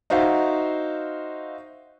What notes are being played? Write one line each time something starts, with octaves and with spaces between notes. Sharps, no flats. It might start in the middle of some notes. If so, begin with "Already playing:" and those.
D#4 F#4 C5 E5 F5